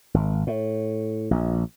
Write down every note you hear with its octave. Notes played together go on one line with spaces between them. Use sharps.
G#1
A2
A#1